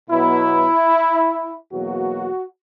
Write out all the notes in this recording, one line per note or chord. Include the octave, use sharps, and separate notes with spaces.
B2 F#3 B3 E4
E2 B2 F#3 A#3 F#4